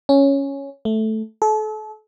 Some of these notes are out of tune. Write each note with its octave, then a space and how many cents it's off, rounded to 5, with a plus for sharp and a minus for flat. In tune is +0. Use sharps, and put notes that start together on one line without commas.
C#4 +0
A3 -5
A4 -35